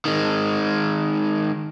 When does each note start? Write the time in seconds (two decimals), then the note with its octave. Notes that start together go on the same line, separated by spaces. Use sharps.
0.05 D#3 G#3